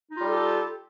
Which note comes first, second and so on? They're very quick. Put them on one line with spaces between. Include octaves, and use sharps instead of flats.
D#4 F4 G3 A4 G4